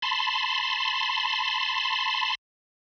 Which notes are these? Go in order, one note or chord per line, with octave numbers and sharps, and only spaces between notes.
A5 B5 C6